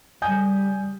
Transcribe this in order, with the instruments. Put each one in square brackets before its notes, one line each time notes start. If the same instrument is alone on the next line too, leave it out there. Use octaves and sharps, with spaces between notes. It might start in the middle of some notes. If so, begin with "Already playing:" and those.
[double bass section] C#3 G3 [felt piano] G#5 D#6 G6